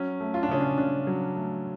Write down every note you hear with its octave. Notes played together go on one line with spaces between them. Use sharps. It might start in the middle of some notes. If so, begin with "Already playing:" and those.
Already playing: F#3 C#4
A3
F4
D4
C#3 C#4
D4
C#3 D4
F#3
A3